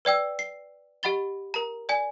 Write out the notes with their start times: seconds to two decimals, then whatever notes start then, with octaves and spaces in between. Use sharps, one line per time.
0.05 B4 D5 G5 E6
0.39 C7
1.03 G4 D#5 F#5 B5 A6 G7
1.54 A#4 A#5
1.89 D5 G#5